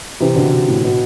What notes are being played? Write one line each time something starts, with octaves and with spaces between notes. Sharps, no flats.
C3 E3
B2 D3
B2
A2
B2